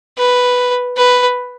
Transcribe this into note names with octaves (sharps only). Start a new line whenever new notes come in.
B4
B4